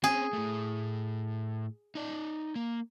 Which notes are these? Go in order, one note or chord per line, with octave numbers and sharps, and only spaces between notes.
C4 C#4 G#4
A2 A3
D#4 D5
A#3